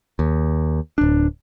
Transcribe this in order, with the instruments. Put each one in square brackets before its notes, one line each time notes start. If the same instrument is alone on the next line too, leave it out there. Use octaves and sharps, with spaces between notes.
[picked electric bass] D#2
D1 D4